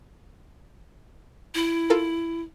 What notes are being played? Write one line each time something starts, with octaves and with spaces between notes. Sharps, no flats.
E4
F4 A4 A#4